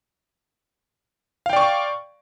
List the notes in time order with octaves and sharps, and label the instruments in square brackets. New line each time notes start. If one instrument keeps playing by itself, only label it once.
[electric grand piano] F5
G5
D5
C#6